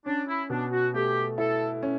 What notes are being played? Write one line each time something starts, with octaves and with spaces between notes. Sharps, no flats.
C#4 D4
E4
B2 D4
F#4
A3 G4
E4 A4
C#4